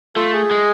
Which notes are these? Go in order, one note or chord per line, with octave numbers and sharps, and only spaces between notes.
A3 F4 A4
G#4
G#3